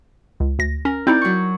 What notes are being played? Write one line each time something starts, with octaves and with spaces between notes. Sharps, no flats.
C#2
D2 A#6
C#4 A#4
C4 D#4 E4 D5 G6
F#3 C#6